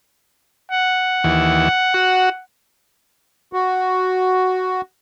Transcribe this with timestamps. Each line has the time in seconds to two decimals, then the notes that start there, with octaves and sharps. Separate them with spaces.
0.71 F#5
1.24 D#2 E3
1.94 F#4
3.53 F#4